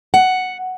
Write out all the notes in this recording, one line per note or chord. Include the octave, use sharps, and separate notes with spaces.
F#5